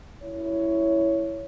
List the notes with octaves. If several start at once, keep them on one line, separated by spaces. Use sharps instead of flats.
F#2 E4 C#5